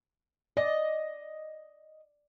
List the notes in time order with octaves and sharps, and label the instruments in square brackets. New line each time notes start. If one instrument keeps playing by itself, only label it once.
[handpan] D5 [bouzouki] D#5